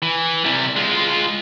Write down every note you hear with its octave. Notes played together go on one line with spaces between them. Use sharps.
E3
C3 G3
G#3 F4